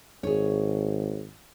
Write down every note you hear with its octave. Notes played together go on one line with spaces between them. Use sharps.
G#1 G#4 C#5